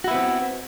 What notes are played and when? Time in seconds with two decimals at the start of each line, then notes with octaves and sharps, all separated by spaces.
0.04 F#4
0.08 E4
0.11 B3
0.14 C4